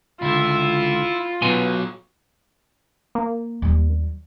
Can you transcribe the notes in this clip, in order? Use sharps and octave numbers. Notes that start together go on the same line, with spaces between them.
C#2 D3 E4 F4
B2 F#3 B4 G#5 C6
A#3
D#2 G3